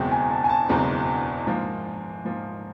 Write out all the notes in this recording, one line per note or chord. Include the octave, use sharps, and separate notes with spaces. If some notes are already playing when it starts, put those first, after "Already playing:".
Already playing: F#1 E2 B2 G#3 C4 G5
G#5
A5
G#5
A5
F#1 E2 B2 G#3 C4 A#5
G#2 F3 A#3
G#2 F3 A#3